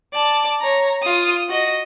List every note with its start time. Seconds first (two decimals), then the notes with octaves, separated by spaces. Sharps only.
0.13 D5 A5
0.61 C#5 A#5
1.02 F4 D#6
1.49 F#4 D#5